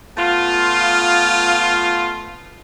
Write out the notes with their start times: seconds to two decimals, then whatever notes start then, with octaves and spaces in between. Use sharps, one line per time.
0.17 A3 B3 F4